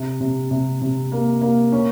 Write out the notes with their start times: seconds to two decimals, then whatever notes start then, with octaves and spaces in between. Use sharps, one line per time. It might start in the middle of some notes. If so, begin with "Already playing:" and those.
Already playing: C3
0.20 C3
0.51 C3
0.82 C3
1.12 A#3
1.41 A#3
1.72 C#4